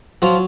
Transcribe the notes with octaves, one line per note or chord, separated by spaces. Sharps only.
F3 F#3 F4